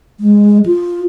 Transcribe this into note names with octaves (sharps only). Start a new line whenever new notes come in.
G#3
F4